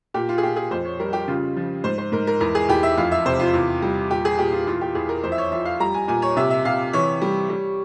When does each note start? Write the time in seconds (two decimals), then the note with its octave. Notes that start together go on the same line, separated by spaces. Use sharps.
0.14 A#2 G4
0.29 F4
0.38 G#4
0.43 A#2 G4
0.56 G#4
0.71 F2 C5
0.85 C#5
0.99 G3 A#4
1.13 G4
1.28 C#3 F4
1.57 F3
1.84 G#2 C5
1.98 C5
2.12 G#2 A#4
2.27 A#4
2.40 E2 A#4
2.55 G#4
2.69 E2 G4
2.83 E5
2.98 F2 F5
3.12 E5
3.25 C3 C5
3.39 F4
3.54 E2
3.82 G3
4.11 A#2 G4
4.25 G#4
4.39 A#2 G4
4.52 F4
4.67 E2 F4
4.81 G4
4.95 E2 G#4
5.09 A#4
5.24 F2 C5
5.32 E5
5.38 C#5
5.51 F3 E5
5.65 F5
5.80 G3 A#5
5.94 G#5
6.08 A#2 G#5
6.22 C#5
6.37 C3 E5
6.50 E5
6.64 C3 F5
6.93 E3 C#5
7.22 G3
7.49 G3